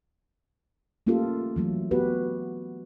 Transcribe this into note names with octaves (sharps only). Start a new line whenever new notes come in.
A3 A#3 C#4 F4 G4 A4
E3 F#3 A3
B3 F#4 G4 B4